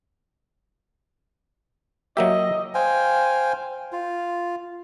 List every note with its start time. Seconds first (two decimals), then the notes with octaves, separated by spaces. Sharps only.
2.17 F#3 A#3 G4 D#5 E5
2.74 C5 F5 G5 G#5
3.92 F4